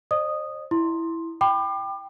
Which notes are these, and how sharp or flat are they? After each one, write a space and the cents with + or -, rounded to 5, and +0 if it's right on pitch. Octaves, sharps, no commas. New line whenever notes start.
C5 +35 D#5 -40 D#6 -10
E4 +0 C6 +5
G5 +0 B5 +15 D6 +35